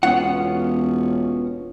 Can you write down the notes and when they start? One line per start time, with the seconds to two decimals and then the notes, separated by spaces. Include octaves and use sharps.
0.03 E1 B3 C#4 F4 F#5